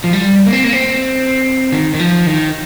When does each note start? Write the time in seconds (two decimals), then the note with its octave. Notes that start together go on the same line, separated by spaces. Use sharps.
0.04 F3
0.13 G3
0.46 A#3
0.53 C4
0.64 A#3
0.73 C4
1.72 D#3
1.94 D#3
2.00 F3
2.27 D#3